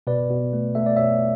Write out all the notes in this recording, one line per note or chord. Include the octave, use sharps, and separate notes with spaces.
B2 B4 D5
B2
A3
A3 E5
D5
B2 C#5 E5